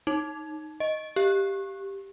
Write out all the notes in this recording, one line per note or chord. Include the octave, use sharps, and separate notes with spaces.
D#4
D#5
G4